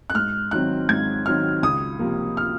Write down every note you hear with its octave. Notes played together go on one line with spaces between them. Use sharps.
F#6
G#2 F6
D#3 F#3 C4 F#6
G#2 G#6
D#3 F#3 C4 F6
C#2 D#6
C3 F3 A#3
F6